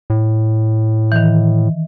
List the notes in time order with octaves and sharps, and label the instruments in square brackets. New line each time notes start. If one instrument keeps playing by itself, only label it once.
[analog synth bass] A2
[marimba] D#3 E3